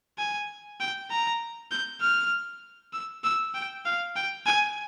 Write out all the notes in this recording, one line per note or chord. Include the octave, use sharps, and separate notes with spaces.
G#5
G5
A#5
G6
F6
E6
E6
G5
F5
G5
G#5